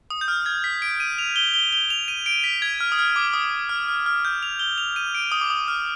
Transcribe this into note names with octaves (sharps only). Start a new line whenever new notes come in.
D#6
G6
F6
G#6
B6
D7
D#7
F7
G7
G7
G7
F7
D#7
D7
B6
G#6
F6
D#6
F6
D6
D#6
F6
F6
F6
G6
F7
G7
F7
D#7
D7
D#6
D6
D#6
F6